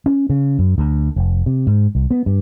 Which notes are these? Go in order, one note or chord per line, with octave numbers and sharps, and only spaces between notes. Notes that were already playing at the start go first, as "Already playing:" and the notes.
C#4
C#3
F#2
D2
F1
C3
G#2
C2
B3
G2